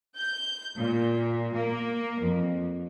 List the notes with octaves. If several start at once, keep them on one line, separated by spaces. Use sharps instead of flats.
G6
A#2
A#3
F2